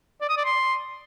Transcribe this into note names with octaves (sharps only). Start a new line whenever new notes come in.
D5
D#6
D5
C6